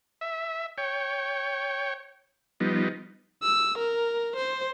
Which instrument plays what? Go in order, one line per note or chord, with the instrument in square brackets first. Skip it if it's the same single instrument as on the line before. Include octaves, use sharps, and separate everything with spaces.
[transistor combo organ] E5
C#5 G5
F3 G3 B3 D#4
[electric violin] E6
A#4
C5